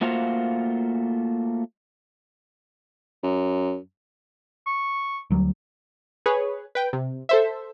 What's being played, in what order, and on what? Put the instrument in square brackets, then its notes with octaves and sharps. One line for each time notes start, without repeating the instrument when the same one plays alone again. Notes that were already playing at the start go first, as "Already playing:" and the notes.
[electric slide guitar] A3 A#3 F4 F#4 C5 F5
[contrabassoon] F#2
[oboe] C#6
[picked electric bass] D2 F#3 G3
[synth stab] G#4 B4 C#5
B4 G5
C3
A4 C5 E5